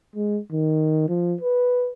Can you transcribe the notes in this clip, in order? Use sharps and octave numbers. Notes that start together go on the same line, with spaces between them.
G#3
D#3
F3
B4